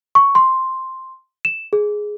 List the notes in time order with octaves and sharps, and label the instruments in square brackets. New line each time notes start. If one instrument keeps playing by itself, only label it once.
[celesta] C#6
C6
E7
G#4